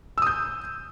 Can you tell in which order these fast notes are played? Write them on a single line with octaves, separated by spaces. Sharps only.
E6 D#6 G6